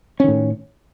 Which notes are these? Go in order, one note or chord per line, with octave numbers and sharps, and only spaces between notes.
A2 D#3 C#4